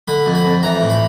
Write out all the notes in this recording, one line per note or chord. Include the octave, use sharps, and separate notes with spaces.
D3 B5
F2
B5
F2
E3 A#5
A2
B5